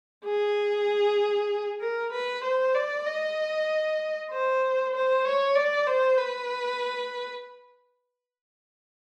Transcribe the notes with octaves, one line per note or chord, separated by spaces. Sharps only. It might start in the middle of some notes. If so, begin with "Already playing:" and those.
G#4
A#4
B4
C5
D5
D#5
C5
C5
C#5
D5
C5
B4